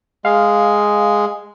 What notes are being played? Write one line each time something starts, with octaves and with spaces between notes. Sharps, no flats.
G#3 F5